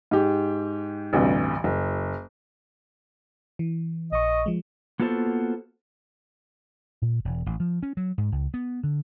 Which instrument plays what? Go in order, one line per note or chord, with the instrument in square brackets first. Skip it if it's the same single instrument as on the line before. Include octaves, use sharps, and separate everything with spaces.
[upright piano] G#2 G4
A1 D2 G2 C3
F#1
[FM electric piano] E3
[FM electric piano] A#1 C#6 [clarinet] D#5
[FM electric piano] F3 G#3
[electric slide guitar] A#3 B3 F4 F#4 A4 C5
[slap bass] A#2
E1
A1
F3
C#4
F#3
G#2
C#2
B3
D3